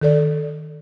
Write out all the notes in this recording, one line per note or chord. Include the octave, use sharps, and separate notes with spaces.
D#3 A4 D5